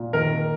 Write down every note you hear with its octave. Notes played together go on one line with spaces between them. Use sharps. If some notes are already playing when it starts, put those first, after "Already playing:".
Already playing: A#2
D#3 A#4